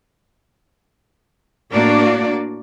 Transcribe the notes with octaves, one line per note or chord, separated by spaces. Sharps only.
A2 A#3 D4 F#4 D5